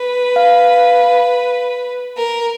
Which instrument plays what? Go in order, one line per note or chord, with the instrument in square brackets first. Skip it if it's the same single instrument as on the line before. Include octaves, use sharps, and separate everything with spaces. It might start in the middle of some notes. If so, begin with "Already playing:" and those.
Already playing: [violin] B4
[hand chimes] F5
[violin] A#4